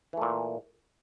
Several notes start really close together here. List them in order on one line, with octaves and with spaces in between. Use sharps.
E3 A3 A#2